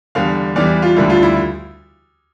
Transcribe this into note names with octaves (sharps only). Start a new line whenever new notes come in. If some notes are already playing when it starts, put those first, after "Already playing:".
E2 D3 G3 F5
E2 E3 G3 D5
F4
D2 D3 G3 E4
F4
E4